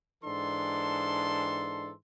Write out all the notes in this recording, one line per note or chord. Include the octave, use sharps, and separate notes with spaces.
G#2 E3 D4 A4 C6